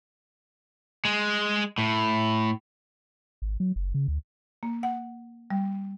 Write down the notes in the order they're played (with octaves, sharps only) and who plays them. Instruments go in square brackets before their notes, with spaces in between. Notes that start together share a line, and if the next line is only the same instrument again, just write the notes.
[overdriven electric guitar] G#3
A2
[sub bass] G#1
F#3
F#1
C#3
D2
[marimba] A#3
F#5
G3